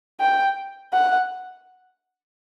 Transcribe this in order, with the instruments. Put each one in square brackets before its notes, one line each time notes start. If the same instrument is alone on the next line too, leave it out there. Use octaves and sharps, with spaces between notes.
[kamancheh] G5
F#5